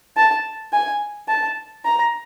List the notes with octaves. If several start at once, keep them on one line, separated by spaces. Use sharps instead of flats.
A5
G#5
A5
A#5